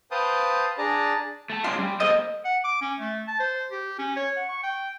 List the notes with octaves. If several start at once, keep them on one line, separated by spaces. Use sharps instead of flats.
B4 C5 F5 G5 A5 D#6
D4 G#4 D5 A5 A#5
A3 A5
C#4 D4 F4 C6
G3
A#3 A4 C5 D#5
F#5
D6
C#4
A3
A5
C5
G4
C#4
C#5
F#5
C#6
G5